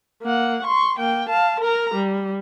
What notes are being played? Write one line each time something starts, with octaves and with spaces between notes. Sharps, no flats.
A#3 F#5
C6 C#6
A#3 G5
F5 A5
A#4 A#5
G3